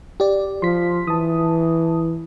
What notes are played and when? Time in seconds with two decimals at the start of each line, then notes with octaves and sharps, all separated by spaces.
0.20 G4 D5
0.62 F3 C6 B6
1.07 E3 A5 D#6